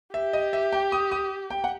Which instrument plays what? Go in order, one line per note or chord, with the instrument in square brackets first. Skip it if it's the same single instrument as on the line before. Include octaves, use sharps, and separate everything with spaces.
[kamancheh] G4 [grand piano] E5
[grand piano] D#5
E5
G5
D#6
D#6
G5
F#5